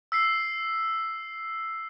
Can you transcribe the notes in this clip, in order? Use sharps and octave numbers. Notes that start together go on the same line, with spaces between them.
E6 B6 C7